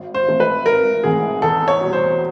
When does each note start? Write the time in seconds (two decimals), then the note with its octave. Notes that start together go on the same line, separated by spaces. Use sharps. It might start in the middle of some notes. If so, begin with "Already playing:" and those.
Already playing: G#1
0.14 C5
0.27 G#2 E3 A3 C4
0.40 B4
0.66 G#1 A#4
1.04 G#2 E3 A3 C4 G#4
1.42 E2 A4
1.68 C#5
1.81 B2 G3
1.93 C5